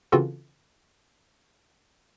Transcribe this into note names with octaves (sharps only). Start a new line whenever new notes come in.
C#3 E3 C4 F4 F#4 A4